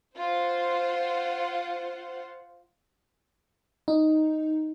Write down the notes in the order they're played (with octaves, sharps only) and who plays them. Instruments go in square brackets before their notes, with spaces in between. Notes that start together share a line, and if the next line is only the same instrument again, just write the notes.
[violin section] F4 C5 F#5
[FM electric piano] D#4